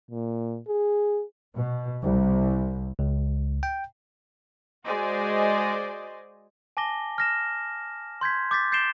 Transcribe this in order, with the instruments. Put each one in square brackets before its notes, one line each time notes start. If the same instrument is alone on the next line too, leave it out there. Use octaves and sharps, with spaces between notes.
[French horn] A#2
G#4
[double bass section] B2
C2
[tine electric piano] C#2
G5
[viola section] G#3 F#4 C5 D5 D#5 G#5
[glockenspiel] G#5 A5 D6 A#6 G7
F6 A#6 E7
C6 G6 G#6 B6
D6 G6 A6 B6
G6 A6 C7 D7 E7 G7